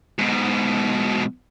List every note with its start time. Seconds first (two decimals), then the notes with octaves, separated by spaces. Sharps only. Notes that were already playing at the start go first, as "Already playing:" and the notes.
0.19 G#2 B2